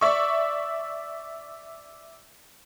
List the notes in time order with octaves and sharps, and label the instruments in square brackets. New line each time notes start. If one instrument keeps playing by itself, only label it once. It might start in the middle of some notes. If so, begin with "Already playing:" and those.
[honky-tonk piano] D5 E5 C#6